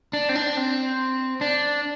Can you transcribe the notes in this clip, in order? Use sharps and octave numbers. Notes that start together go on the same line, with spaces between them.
D4
C4
D4
C4
D4